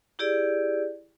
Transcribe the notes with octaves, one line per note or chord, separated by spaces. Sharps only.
E4 G4 G#4 D5